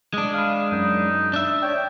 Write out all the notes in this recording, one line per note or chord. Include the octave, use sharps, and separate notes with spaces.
G#3 D4 D#6
F5 B5 D#6
F#2 D#4
D4 E5
C#5 D5 G5